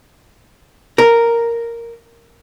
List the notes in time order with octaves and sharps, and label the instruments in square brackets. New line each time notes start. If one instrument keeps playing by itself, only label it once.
[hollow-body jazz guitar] A#4